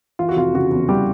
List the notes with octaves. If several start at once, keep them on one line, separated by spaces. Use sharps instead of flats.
E3 F4
F#4
F1 F4
C#3 F#4
E2
E3 G3 G4